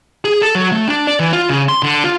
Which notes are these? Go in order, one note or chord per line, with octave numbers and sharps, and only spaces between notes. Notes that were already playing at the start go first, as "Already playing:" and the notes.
G#4
A4
F#3
A3
D4
D5
E3
F4
C#3
C6
D3
F4